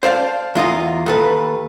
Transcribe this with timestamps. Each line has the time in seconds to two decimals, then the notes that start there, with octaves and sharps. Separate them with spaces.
0.03 C5 D5 F5 A5
0.55 E2 F4 D#5 A#5
1.06 D#2 A4 B4